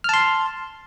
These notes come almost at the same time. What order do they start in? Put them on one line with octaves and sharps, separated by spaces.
F6 A5 C6